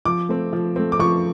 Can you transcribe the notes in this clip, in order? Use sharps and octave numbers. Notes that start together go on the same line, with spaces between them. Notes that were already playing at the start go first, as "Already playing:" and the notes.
F3 D6
A3 C4
F3
A3 C4
D6
F3 C#6